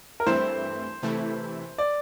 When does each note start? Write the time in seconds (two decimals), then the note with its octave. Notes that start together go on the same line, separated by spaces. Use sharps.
0.20 A#4
0.26 G2 E3 A3 C4 E4 C5
1.03 C3 E3 A3 E4
1.78 D5